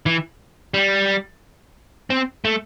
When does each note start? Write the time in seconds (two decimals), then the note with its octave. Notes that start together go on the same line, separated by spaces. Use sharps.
0.06 E3
0.74 G3
2.10 C4
2.45 A3